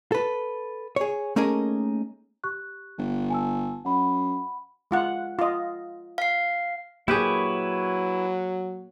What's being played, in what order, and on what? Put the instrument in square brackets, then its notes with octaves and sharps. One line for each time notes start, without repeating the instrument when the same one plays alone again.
[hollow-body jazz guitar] A4 B4
G#4 C#5
A3 A#3 C#4 D#4 G#4 A#4
[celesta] G4 C#6 F#6
[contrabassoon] G1
[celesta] G#5 A5 E6
[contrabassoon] F#2 [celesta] F#5 B5
[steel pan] G#3 F4 F#5
F4 D#5
[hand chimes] F5 C7
[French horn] F#3 [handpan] A#3 [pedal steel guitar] E4 B4 C#5 [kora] G4 G#4